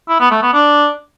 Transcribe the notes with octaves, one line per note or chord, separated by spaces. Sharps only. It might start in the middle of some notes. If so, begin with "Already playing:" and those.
E4
B3
A3
B3
D4